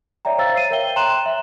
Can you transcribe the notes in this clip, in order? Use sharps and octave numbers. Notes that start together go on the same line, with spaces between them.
C#5 D5 E5 G5 A#5
C5 C#5 F5 A#5 E6 A6
C7 D#7
A#4 C#5 E5 G5 G7
G5 A#5 C6 F#6 E7 F#7
E5